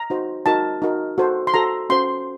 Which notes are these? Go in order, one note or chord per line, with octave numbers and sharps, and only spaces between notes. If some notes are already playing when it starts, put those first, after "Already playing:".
Already playing: A#5
D#4 F#4 C5
D#4 F#4 A#4 A5
D#4 F#4 A#4
F#4 A4 C5
C6
F#4 A4 C5 A#5
C#4 F#4 C5 C6